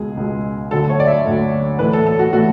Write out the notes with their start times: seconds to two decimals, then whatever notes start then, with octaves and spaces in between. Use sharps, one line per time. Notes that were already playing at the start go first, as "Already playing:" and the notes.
Already playing: C#2 B2 G#3 G#4
0.17 C#2 B2 G#3
0.71 D2 D3 F#3 A3 A4
0.89 C#5
1.00 D5
1.07 E5
1.25 D2 D3 F#3 A3
1.79 A2 E3 A3 B4
1.93 A4
2.06 A4
2.19 F#4
2.33 A2 E3 A3 F#4